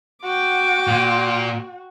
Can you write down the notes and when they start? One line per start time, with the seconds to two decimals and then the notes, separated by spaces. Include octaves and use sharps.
0.23 F#4 G5 D6
0.87 A#2